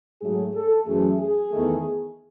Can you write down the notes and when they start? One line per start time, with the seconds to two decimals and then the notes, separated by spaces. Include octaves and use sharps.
0.21 G#2 F#3 A3 G#4
0.54 A4
0.86 F#2 E3 A3 G#4
1.19 G#4
1.51 E2 D#3 A3